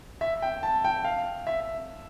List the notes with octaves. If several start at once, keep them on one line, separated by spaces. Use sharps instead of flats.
E5
G5
A5
G5
F5
E5